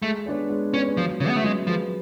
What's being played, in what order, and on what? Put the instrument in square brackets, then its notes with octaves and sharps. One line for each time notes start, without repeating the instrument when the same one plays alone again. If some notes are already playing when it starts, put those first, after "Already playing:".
[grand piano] G#3 [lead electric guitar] A3
[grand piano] B3 D4 G#4 C#5
G#3
[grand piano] B3 D4 G#4 C#5 [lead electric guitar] C#4
[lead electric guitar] F3 [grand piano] F#3
[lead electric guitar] C#3 [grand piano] C#4 G#4 B4
[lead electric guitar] B3
A3
[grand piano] F#3 [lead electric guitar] G#3
[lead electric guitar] F3 [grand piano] C#4 G#4 B4